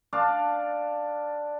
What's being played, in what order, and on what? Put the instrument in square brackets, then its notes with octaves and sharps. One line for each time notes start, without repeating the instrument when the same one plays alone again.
[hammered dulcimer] D4 D5 F5 A5